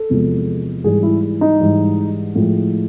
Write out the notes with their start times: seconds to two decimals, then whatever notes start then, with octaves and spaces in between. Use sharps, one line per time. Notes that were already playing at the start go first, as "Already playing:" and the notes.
Already playing: A4
0.10 E2 C3 F3 G#3
0.84 G#2 E3 G3 G#4
1.03 E4
1.41 D#4
1.60 G#2 E3 G3
2.35 A2 F3 G#3